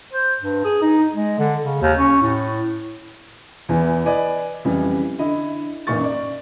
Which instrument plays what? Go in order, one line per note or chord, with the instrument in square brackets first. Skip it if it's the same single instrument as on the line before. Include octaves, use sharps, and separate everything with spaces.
[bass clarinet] C5
G2
G#4
D#4
G#3
D3
C#3
D#2
C#4
A2
[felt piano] E2 E3
B4 D5 D#5 G#5
F2 C#3 E3 G3
D3 E4 D#5
A1 F#2 A#2 D#4 C#6 A6
D5